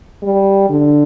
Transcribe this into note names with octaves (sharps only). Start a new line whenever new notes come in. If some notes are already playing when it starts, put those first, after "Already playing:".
G3
D3